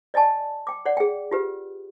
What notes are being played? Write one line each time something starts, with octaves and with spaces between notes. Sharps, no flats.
D5 D#5 G#5 A5 C#6
G5 D6
C#5 D5 F#5
G#4 G5
F4 G4 B4